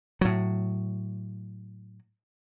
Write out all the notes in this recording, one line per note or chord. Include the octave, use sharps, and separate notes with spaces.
A2 F#3